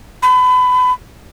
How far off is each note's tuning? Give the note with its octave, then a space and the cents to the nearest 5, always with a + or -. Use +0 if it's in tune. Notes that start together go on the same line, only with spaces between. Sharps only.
B5 +30